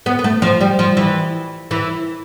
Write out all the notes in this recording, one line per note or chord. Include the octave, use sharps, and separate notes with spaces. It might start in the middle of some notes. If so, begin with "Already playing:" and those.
B3
B3
A3
F3
G3
F3
E3
E3